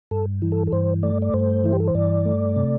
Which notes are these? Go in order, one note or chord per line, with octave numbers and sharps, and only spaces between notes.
G2 A4
E3
A4
A4
G2 C5
A3 D5
D5
G2 C5
E3 E4
G4
A4
C5
G2 D5
A3
C3